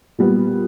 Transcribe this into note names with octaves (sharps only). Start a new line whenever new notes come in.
A#2 G3 B3